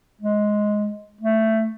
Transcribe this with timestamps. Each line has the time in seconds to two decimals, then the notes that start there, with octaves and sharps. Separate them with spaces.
0.21 G#3
1.21 A3